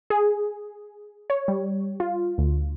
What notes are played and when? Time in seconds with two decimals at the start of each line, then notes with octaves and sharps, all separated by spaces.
0.10 G#4
1.30 C#5
1.48 G3
2.00 F4
2.38 D2